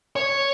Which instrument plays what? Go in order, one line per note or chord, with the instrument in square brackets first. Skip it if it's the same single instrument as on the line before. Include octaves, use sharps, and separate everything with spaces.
[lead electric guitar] C#5